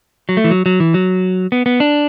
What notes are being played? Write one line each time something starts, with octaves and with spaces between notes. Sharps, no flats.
F#3
A3
E3
F#3
F#3
E3
F#3
B3
B3
D4